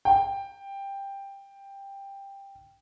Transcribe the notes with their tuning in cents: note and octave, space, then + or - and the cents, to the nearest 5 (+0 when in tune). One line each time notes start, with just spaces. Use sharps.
G5 +10